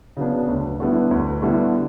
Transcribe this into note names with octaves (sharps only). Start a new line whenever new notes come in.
C#3 F#3 B3 D4
D2
D3 G3 B3 E4
D2
D3 G3 B3 E4